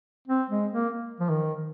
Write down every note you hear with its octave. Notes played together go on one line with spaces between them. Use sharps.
C4
G#3
A#3
F3
D#3